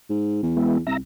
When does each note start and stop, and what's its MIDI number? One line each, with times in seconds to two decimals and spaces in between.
0.10 0.39 44
0.43 0.80 40
0.57 0.78 56
0.57 0.78 59
0.57 0.78 64
0.87 0.98 36
0.87 0.97 76
0.87 0.97 82